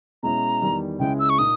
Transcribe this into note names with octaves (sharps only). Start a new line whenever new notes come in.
B2 G#3 C#4 E4 A#5
E2 D#3 G3
C#2 C#3 G#3 C#4 E4 G5
E6
C#6
A#2 A#3 D#4 D#6